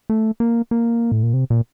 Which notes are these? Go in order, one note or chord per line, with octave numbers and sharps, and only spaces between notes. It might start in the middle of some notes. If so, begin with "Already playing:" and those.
A3
A#3
A#3
A2
A#2
C3
A#2